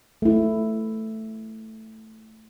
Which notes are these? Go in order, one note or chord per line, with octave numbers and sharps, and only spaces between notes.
A3 E4